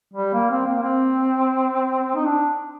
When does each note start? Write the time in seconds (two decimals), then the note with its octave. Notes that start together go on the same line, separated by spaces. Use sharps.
0.13 G3
0.34 A#3
0.51 C4
0.66 A#3
0.82 C4
2.16 D#4
2.26 D4